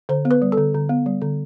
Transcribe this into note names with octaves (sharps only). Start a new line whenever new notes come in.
D3 C5
B3
B4
G3
A4
D3
D3
B3
G3
D3